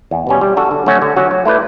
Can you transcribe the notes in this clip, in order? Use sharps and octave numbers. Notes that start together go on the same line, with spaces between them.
E2
B2 G3 C#4
G3
D4 F#4 A4
D3
F#3 A3 C#4 F#4
D3
F#3 C#4 F#4
F#3
A3 E4 B4 D5